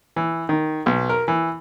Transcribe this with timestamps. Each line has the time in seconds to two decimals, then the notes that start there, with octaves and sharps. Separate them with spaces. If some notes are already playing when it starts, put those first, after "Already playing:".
0.16 E3
0.49 D#3
0.86 B1
1.09 A#4
1.28 E3